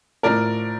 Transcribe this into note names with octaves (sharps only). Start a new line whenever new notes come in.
A2 F3 A#4 D5